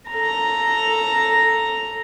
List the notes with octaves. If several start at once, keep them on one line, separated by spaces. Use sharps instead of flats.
A4 A#5